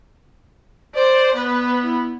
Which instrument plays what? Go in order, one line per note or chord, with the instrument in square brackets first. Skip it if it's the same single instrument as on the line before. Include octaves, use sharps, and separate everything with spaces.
[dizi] C5 [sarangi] D5
[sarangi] B3 [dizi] B4
[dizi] E4